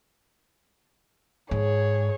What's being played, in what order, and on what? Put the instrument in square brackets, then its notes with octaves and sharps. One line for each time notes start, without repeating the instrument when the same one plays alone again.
[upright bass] G#2 [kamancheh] G#4 C#5